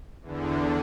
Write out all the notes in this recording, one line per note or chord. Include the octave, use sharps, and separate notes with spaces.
E2 D3